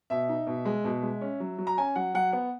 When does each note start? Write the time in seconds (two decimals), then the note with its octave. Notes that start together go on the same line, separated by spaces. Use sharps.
0.10 B2 E5
0.29 D#4
0.47 B2
0.65 G#3
0.84 B2
1.02 G#3
1.21 C#4
1.40 F#3
1.58 F#3
1.67 A#5
1.78 C#4 G#5
1.96 F#3 F#5
2.14 F#3 F#5
2.32 B3 F#5